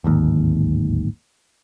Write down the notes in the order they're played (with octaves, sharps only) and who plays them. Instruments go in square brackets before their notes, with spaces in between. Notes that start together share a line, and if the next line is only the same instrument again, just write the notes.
[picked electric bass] D1 G#1 D#2